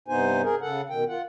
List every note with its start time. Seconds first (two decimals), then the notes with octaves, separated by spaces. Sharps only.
0.08 G2 C3 B3 D#4 C5 G#5
0.43 G#4 A#4
0.61 C#3 A4 F#5
0.90 B2 D#3 G5
1.08 F4 F#5